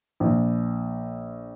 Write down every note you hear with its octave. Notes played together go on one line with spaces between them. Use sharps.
A#1